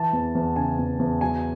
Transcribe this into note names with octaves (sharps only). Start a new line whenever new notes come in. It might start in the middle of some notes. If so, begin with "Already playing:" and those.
Already playing: E3 A5
E2
E2
C#3 G#5
E2
E2
F#3 G#5